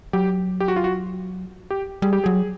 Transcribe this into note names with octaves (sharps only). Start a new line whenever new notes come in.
F#3 G4
G4
F#4
F4
F#4
G4
G3 G#4
G4
F#3 G#4